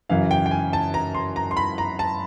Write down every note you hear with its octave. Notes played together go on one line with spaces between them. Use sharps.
F#2 C#3 E3 F5
G5
G5
G#5
A5
A#5
C6
A#5
C6
B5
A#5
A5